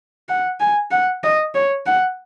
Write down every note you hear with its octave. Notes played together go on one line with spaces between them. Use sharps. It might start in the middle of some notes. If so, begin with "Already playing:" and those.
F#5
G#5
F#5
D#5
C#5
F#5